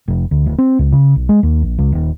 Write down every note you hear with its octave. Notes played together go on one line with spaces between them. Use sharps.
F1
D2
D1
C4
C#2
C#3
B1
G#3
D#2
A#1
C#2
D#1